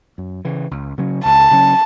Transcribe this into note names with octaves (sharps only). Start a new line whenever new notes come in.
F#2
C#3 E3
C#2
C#3 F#3 C#4
C#2 A5
C#3 F#3 C#4